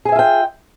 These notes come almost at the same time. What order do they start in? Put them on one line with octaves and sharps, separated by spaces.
G#4 G#5 E5 F4 G5